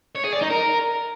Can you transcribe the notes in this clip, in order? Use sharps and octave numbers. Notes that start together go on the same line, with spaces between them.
C#5
G#4
D5
D#4
A#4